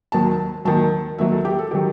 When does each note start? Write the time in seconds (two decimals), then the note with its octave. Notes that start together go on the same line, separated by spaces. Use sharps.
0.12 D#2 D#3 F#3 A5
0.65 D#2 D#3 F#3 A5
1.18 D#2 D#3 F#3 E5
1.31 A4
1.45 G4
1.59 A4
1.71 D#3 F#3 G4